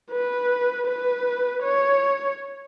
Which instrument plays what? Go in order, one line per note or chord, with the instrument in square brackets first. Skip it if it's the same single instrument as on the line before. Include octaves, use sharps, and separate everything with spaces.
[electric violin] B4
B4
C#5